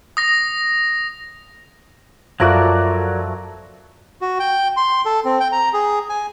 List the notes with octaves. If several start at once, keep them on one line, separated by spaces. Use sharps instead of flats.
D#6 A#6
F#2 F3 F#3 A3 F#4 A#4 D5 F#6
F#4
G5
C6
A4
C4
G5
A#5
G#4
G#5